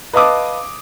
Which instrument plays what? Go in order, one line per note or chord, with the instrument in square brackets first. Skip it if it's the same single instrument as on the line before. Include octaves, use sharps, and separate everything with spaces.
[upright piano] B4 D#5 F5 A5 D6 D#6